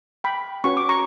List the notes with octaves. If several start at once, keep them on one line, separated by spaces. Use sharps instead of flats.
G5 B5
C#4 F#4 B4 C#6
D6
A#5 C#6